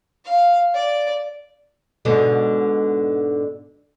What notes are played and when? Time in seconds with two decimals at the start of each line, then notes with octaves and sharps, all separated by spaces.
0.25 F5
0.74 D5
2.05 G#2 B2 D3